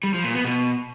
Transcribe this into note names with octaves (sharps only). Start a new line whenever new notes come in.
G3
F3
A#2
B3
B2